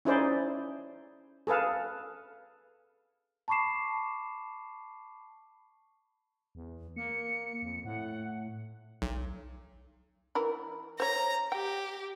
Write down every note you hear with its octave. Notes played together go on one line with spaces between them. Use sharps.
C#4 D#4 E4 G#4 C5 D5
G#4 A4 B4 F5
A5 B5 C#6 D6 C7 E7
E2
A#3 C#7
F2
A2 F#5
B1
E3 A#4 B5
C5 C#5 A#5
G4 G5